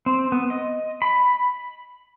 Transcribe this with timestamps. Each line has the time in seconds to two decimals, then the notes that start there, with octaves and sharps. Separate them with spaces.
0.06 C4
0.32 B3
0.50 D#5
1.02 B5